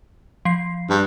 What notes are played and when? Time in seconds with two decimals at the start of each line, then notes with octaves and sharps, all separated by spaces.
0.45 F3 C7
0.90 G2